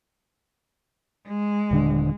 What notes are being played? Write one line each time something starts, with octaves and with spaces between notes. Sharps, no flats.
G#3
D#1 D3 D4